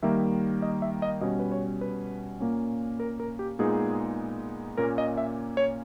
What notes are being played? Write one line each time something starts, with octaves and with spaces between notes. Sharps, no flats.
D#3 G3 A#3 E5
D#5
E5
D#5
B2 G3 C#4 D#5
B4
C#5
B4
A#2 A#3 C#4
A#4
A#4
G4
A#2 G#3 B3 D#4 G#4
A#2 A#3 C#4 A#4
D#5
E5
C#5